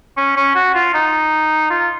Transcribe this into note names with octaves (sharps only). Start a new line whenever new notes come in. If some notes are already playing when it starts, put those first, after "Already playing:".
C#4
C#4
F#4
F4
D#4
F4